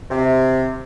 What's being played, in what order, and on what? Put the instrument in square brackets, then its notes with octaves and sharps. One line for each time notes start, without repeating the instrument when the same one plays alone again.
[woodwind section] C3